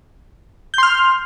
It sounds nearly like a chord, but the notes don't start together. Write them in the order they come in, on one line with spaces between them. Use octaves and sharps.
G6 C6 F6